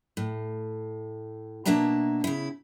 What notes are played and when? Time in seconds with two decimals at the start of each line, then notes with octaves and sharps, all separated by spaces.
0.17 A2
1.66 B2 A#3 D4 E5 A5 A#5
2.24 C#3 E4